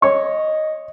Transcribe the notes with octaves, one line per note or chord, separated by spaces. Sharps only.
C#5 D#5 C#6